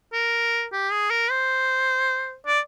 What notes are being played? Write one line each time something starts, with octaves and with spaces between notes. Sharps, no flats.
A#4
G4
G#4
A#4
C5
D5